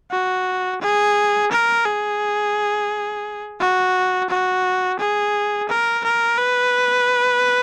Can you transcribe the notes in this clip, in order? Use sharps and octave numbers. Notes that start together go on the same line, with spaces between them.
F#4
G#4
A#4
G#4
F#4
F#4
G#4
A#4
A#4
B4